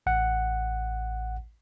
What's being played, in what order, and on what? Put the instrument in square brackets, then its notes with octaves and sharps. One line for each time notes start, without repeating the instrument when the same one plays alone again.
[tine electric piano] A1 F#5